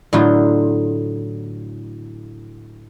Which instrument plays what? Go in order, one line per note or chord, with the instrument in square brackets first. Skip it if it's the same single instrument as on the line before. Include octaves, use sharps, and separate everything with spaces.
[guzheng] A2 D3 F#3 D#4 F4